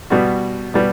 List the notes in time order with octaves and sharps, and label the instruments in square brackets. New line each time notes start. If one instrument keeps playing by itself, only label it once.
[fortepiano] B2 G3 B3 F#4
B2 G3 B3